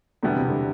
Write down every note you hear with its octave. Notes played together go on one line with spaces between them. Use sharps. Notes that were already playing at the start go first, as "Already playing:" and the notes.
E2 B2 D3 G3 B3 E4
C3
D3